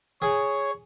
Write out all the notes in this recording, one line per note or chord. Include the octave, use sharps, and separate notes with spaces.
G#4 C#5